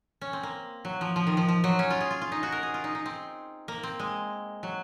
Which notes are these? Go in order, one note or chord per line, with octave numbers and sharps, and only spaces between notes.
C#4
C4
A#3
F#3
F3
F3
D#3
F3
F3
F#3
C#4
F4
G#4
F4
F4
D#4
F#4
A#4
G#4
F4
D#4
D#4
C4
A#3
C4
G#3
F#3